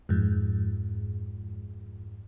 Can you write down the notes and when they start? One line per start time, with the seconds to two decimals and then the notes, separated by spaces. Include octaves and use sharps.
0.09 F2 G#2